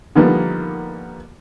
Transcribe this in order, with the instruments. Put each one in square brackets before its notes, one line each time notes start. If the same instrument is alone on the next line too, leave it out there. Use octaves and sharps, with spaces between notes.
[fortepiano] D3 D#3 F3 G3 A#3 B3